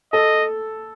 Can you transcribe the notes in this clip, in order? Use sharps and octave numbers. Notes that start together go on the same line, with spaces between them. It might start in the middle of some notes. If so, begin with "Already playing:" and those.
A4 D#5